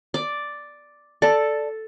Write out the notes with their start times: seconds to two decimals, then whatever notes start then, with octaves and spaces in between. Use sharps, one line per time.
0.14 D5
1.22 A4 D5 A5